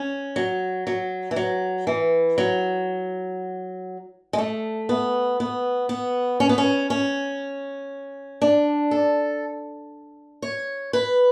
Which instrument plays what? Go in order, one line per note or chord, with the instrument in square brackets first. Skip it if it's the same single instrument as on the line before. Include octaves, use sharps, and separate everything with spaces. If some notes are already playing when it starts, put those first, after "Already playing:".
Already playing: [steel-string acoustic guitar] C#4
F#3
F#3
E3
F#3
E3
F#3
G#3
A3
B3
B3
B3
C#4
B3
C#4
C#4
D4
A4
C#5
B4